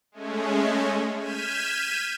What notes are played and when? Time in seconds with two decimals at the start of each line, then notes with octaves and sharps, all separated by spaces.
0.12 G#3 A3 C#4
1.18 F6 G6 G#6 B6 D#7 E7